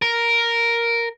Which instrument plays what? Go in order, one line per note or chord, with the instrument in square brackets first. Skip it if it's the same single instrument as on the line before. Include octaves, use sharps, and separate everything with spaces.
[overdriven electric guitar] A#4